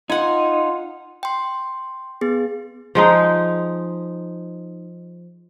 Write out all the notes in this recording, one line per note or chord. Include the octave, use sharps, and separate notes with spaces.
D#4 F4 F#5 G#5
G5 C6
B3 G#4
F3 G#3 D#4